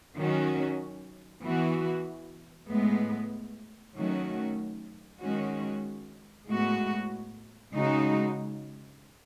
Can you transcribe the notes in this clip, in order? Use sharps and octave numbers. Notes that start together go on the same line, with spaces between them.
D#3 F#3 C#4 F#4
E3 B3 F#4
A2 G#3 B3
D#3 F#3 A3 C#4 F#4
D#3 G#3 C#4 F#4
A2 G#3 B3 F#4
C#3 G#3 D#4 F#4